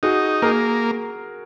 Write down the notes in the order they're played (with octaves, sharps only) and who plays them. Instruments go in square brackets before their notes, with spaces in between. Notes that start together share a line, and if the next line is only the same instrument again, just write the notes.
[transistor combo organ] D#4 [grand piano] F#4 G#4
[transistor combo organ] A#3 [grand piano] G#4 A#4